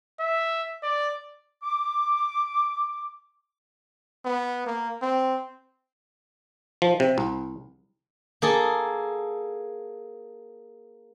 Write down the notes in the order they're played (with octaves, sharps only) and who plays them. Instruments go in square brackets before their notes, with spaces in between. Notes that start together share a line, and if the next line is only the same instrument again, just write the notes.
[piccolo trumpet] E5
D5
[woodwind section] D6
[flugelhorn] B3
A#3
C4
[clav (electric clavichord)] F3
C3
C2
[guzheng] A#3 G#4 A4